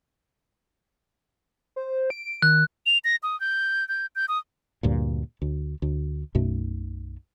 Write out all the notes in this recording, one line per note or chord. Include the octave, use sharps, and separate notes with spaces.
C5
D7
D#3 F#6
F7
A#6
D#6
G6
G6
G6
D#6
D2 G2 A#2
D2
D2
B1 F#2 B2 A3